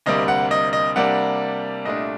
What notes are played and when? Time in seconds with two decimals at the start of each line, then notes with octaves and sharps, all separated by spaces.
0.06 D2 C3 G3 A#3 D#5
0.28 F#5
0.51 D#5
0.73 D#5
0.96 C3 G3 A#3 D4 F#5
1.85 C2 A#2 A3 D4 D#5